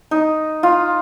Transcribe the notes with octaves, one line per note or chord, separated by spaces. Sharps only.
D#4
F4